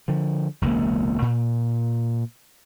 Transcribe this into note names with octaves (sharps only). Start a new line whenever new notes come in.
D3 F3
E1 C#2 C3 A#3
A#2